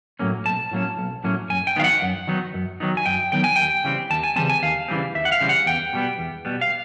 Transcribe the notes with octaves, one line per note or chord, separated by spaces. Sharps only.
A2 F#3 A#3 C#4
B1 A5
A2 F#3 A#3 C#4
B1
A2 F#3 A#3 C#4
F#2 G#5
G5
D#3 F#3 B3 D#4 F5
F#5
F#2
D#3 F#3 B3 D#4
F#2
D#3 F#3 B3 D#4
G#5
F#2 G5
D#3 F#3 B3 D#4 G5
G#5
D#2 G5
C#3 E3 G3 C4
D#2 A5
G#5
C#3 E3 G3 C4 A5
G#5
D#2 F5
C#3 E3 G3 C4
D#2 E5
F#5
F5
C#3 E3 G3 C4
F#5
E2 G5
B2 G3 B3
E2
B2 G3 B3
F5